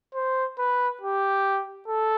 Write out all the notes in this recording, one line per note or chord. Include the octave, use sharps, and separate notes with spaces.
C5
B4
G4
A4